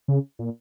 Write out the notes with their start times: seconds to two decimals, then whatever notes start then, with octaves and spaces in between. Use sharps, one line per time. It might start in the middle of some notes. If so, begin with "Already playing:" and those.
0.08 C#3
0.39 A#2